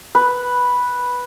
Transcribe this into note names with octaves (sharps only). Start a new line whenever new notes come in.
B4